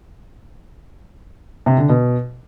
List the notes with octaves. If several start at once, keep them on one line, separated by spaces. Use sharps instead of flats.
C3
D3
B2